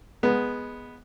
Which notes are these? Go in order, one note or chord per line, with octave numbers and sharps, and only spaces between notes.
G#3 B3